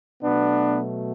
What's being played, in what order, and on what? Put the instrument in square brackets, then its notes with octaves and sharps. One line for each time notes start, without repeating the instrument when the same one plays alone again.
[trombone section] B2 F#3 A3 B3 D4